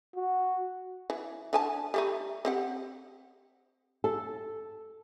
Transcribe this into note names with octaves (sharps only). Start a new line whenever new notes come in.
F#4
E3
D3 G#5 A5
G3 A3 D#4
C4 G4 F#5
A4